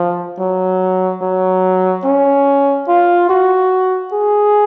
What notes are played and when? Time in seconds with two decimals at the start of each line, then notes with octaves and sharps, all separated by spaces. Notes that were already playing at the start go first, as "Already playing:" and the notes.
Already playing: F3
0.40 F#3
1.22 F#3
2.04 C#4
2.88 F4
3.29 F#4
4.13 G#4